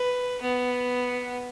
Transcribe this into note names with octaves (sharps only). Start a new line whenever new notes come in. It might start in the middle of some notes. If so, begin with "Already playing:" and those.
Already playing: B4
B3